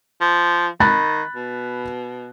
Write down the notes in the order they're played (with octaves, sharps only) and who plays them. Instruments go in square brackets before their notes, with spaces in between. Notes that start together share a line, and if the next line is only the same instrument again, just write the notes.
[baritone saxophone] F3
[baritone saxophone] D#3 [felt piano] B5 F#6 A6
[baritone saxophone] B2